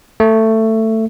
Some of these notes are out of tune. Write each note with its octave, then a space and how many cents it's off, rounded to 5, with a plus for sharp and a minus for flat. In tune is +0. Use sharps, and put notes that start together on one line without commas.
A3 +15